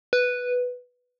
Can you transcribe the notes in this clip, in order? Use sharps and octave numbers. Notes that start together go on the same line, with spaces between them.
B4